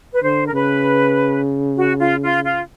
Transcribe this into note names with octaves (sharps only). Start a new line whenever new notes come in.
B4
D3 C5
A#4
C#3 B4
F#4
F4
F4
F4